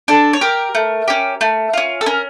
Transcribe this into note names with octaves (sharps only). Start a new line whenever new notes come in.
D4 A4
C#5
G4 A#4
A3
C#4 G4
A3
C#4 F4
A4
C#4 A#4